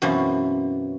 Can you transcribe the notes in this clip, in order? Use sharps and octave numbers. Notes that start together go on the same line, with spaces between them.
F#2 B2 E3 A#3 C4 C#4